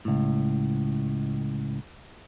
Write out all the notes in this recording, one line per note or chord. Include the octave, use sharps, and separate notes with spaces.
C#2 A2